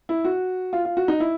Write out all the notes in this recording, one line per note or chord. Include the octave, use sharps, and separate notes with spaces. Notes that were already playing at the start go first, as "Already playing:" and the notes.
E4
F#4
F4
F4
F#4
D#4
E4